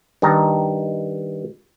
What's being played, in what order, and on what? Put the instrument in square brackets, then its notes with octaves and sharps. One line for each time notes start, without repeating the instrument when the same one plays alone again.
[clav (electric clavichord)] G2 D#3 D#5 A5 A#5